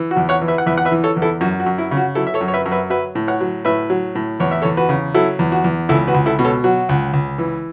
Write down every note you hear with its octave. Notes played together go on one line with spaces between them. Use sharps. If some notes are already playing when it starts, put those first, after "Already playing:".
Already playing: E3
F#4
E2
C#5 F#5
E3
B4 E5
F#5
E2 B4 E5
F#5
B4 E5
E3
A4 C#5
E2
E4 A4
F#2 F#4
F#4
F#2
E4
C#3
F#4
F#3 E4 A4
E5
A4 C#5
F#2
C#5
B4 E5
F#2
B4 E5
F#3 B4 E5
A2
C#5 F#5
F#3
A2 B4 E5
F#3
A2
E2 C#5
E5
E2 A4 C#5
F#4 B4
C#3
F#3 E4 A4
E2
F#4
E2
C#2 E4 A4
F#4 B4
C#2
E4 A4
B2
A4 C#5
F#3 F#4
C#2
C#2
E3